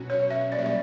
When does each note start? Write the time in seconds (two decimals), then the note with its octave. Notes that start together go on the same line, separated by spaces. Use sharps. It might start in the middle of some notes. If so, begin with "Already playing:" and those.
Already playing: B2 F#3 C#4 F#4
0.10 C#5
0.30 E5
0.52 A#2 G3 D5
0.59 E5
0.66 D5